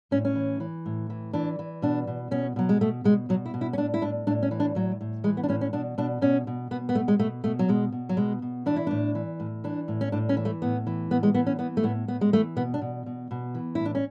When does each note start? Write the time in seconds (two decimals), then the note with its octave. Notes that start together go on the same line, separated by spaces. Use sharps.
0.11 A2 C#4
0.25 C#4
0.36 E3
0.60 E3
0.86 A2
1.10 E3
1.33 E3 D4
1.59 E3
1.82 B2 D4
2.07 B2
2.31 B2 C#4
2.56 B2 F#3
2.69 G#3
2.81 B2 A3
3.04 B2 G#3
3.29 B2 F#3
3.45 E4
3.54 B2
3.61 E4
3.73 C#4
3.77 A2 D4
3.94 E4
4.02 A2 D4
4.27 A2 D4
4.43 C#4
4.51 E3
4.60 D4
4.75 A2 F#3
5.01 A2
5.24 E3 G#3
5.37 B3
5.43 D4
5.49 A2 C#4
5.61 C#4
5.73 B2 D4
5.98 B2 D4
6.21 B2 C#4
6.47 B2
6.71 B2 B3
6.89 B3
6.95 B2 A3
7.08 G#3
7.19 B2 A3
7.44 B2 A3
7.59 F#3
7.68 B2 G#3
7.92 B2
8.09 F#3
8.17 B2 G#3
8.42 B2
8.66 E3 D4
8.76 E4
8.87 A2 D4
9.15 E3
9.40 A2
9.64 E3 D4
9.88 A2
10.01 C#4
10.12 A2 D4
10.29 C#4
10.37 E3
10.45 A3
10.62 A2 B3
10.87 E3
11.11 A2 B3
11.23 G#3
11.34 E3 B3
11.46 C#4
11.59 E3 B3
11.77 A3
11.83 A2 B3
12.08 A2 B3
12.21 G#3
12.33 E3 A3
12.56 B2 B3
12.74 D4
12.81 B2
13.06 B2
13.31 B2
13.55 E3
13.75 A2 E4
13.85 D4
13.95 C#4